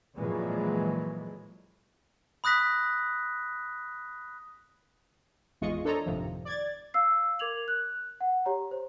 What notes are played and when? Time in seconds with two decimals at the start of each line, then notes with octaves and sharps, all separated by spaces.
0.16 F2 A#2 E3 F#3 G#3
2.44 B5 D#6 F#6 A#6 B6
5.61 G#1 E2 G#3 F4 D#5 C#6
5.85 D4 A4 C5 C#5 D#5 A#5
6.06 G#1 F2 A2 C3 D#3 F3
6.45 D5 G#6 A6
6.94 F5 E6 C7
7.39 A#4 D6 G#6 F7 F#7
7.68 F#6
8.21 F#5
8.46 G4 C#5 A#5
8.71 C5